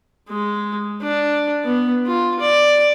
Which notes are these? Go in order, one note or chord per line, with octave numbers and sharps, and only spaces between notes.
G#3
D4
B3
F4
D5